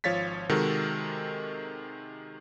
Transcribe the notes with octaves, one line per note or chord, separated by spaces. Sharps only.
G#1 F3 C#5 F5 A6 B6
C3 D#3 G#3 F#4 A4 A#4